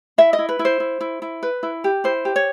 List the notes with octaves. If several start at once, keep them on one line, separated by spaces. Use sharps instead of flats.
E4 E5
D#5
E4
B4
E4
C5
E4
E4
E4
B4
E4
G4
E4 C5
G4
C#5